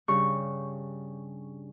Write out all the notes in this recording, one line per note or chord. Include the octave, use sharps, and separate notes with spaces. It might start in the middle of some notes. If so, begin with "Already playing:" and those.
G2 C#3 C#6